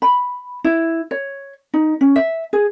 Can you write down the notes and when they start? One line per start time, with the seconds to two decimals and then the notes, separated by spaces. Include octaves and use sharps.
0.02 B5
0.64 E4
1.11 C#5
1.74 D#4
2.01 C#4
2.16 E5
2.53 G#4